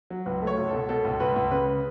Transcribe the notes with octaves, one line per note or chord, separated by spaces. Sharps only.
F#3
C#2 B4
A3
C#5
C#2
A4
B2
B2 A4
C#2
C#2 B4
C#2
C#3 B4